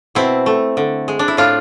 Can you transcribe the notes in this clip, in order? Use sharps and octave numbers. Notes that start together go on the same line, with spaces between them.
B2 C4 E4
A3
D3
G#3
D4
E4
A2 D4 F4